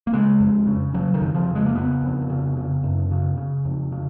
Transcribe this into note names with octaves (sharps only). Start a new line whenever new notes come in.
A#3
C#3 G#3
F2
C#3
C#3 F#3
D#3
F2
F3
C#3
G#3
A#3
C#3 B3
F2
C#3
C#3
F#2
C#3
C#3
F2
C#3